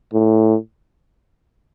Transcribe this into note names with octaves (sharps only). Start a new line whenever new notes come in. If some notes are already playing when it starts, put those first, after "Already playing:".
A2